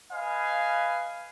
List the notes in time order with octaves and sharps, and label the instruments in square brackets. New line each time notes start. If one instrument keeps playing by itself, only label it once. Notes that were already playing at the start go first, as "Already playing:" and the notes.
[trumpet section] B4 D#5 F5 G#5